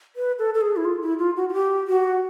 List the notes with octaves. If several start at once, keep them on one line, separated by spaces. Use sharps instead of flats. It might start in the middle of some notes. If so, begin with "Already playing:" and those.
B4
A4
A4
G#4
E4
F4
E4
F4
F#4
F#4
G4
F#4